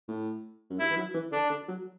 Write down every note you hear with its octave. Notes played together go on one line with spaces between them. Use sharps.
A2
F#2
G2 E4
E3
F#3
E3
D3 D4
D3
F#3